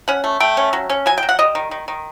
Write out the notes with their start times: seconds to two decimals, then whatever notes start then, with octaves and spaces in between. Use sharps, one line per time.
0.08 C#4 F#5
0.24 A3
0.40 A3 G5
0.57 C#4
0.73 F#3
0.90 C#4
1.06 F#3 G#5
1.18 G5
1.23 F#3
1.29 F#5
1.39 G3 D#5
1.55 D#3
1.71 D#3
1.88 D#3